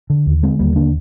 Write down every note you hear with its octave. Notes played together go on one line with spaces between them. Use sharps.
D3
D#2
D3 G#3 C4
D#2 G3 A#3
D3 A#3 D4